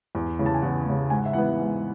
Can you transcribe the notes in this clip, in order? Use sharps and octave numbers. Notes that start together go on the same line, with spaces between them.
E2
C#3 E3
A5
G#5
E2 F#5
C#3 E3
G#2 G#5
F#5
E5
E3 B3 F#5
G#2